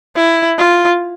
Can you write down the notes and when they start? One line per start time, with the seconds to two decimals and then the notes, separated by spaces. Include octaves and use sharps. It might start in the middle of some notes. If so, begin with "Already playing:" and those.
0.16 E4
0.58 F4